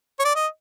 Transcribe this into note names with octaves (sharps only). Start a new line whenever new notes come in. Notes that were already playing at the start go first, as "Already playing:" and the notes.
C#5
D5
D#5